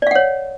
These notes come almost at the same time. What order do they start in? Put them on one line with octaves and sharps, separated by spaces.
D5 F5 F#5 C#5